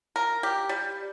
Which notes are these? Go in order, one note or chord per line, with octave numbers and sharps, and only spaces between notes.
A#4
G4
G3